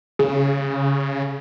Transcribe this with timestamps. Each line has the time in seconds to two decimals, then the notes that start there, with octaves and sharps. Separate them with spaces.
0.19 C#3 G#4